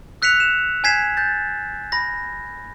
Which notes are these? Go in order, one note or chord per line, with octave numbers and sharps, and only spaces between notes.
E6 F#6 B6 C#7 F7
E7
G#5 G6 G#6 B6 C7 E7
G6 A6
B5 A#6